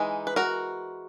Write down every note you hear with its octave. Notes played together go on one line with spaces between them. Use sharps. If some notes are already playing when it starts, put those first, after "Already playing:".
Already playing: E3 G#3 D#4
B4
F#4 A#4